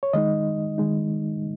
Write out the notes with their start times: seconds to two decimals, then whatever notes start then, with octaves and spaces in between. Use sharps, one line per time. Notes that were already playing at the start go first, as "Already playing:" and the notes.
0.03 C#5
0.13 D#3 G#3 D#4 D#5
0.78 D#3 G#3 D#4